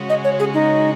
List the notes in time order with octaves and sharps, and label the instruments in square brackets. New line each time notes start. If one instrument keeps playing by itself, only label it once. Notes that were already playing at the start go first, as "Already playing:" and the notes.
Already playing: [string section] C#3 G#3 C#4 F#4
[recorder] D#5
C#5
G#4
D#4